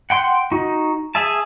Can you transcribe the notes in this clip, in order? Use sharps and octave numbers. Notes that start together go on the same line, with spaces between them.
F#5 G5 C6
D#4 F#4
G#4 E5 A5